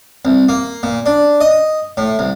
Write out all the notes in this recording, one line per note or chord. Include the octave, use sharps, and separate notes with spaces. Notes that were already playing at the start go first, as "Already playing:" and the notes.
C2
A#3
A#2
D4
D#5
A2
C2